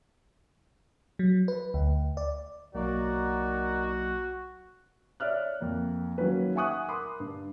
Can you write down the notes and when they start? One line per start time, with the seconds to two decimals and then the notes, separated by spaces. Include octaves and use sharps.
1.19 F#3
1.48 B4
1.74 D2
2.17 D5
2.75 B1 F#3 A#3 D#4 F#4 A#4 D5
5.20 C#5 D5 E5 F6 F#6
5.61 F2 A#3
6.18 D#3 F#3 A#3 C#4 B4
6.55 E5 F#5 G#5 C#6 D#6 F#6
6.88 A#4 B5 C6 D6 D#6
7.20 G2